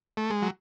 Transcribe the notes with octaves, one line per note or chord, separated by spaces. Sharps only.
A3
G#3
F#3